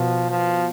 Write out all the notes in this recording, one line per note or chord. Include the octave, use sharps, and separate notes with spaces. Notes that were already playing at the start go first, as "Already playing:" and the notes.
Already playing: B2 F3
F3